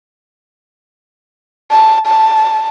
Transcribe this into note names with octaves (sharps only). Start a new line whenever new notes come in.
A5
A5